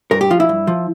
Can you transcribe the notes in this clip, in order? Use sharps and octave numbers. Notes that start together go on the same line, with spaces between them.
G2 A#4
G4
F3 F4
E4
G2
F3